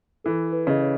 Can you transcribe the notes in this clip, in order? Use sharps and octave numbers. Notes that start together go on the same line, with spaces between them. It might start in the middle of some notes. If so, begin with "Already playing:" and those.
E3 A4
B4
C#3 D#5
C#5